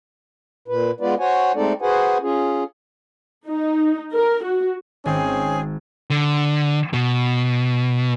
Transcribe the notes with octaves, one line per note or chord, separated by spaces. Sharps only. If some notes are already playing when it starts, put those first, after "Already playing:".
A#2 B4
G#3 B3 F4 B4 D5
F#4 C5 C#5 F#5 G#5
G#3 A3 C4 D#4 A4 D5
F#4 G#4 B4 C5 F#5 G#5
C#4 F4 G#4
D#4
A#4
F#4
G#1 C4 C#4 G#4
D3
B2